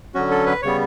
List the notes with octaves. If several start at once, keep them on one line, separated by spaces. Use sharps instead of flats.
D3 F#3 C#4 F#4
A4
B4
C#3 G3 B3 C#5